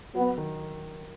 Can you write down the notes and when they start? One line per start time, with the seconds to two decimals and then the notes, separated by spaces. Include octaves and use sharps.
0.15 F#3 B3
0.38 D#3